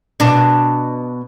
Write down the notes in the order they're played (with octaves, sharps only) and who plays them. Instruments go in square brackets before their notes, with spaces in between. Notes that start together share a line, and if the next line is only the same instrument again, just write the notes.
[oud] B2 D4